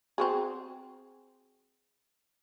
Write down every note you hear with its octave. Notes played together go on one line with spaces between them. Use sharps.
C4 F#4 G#4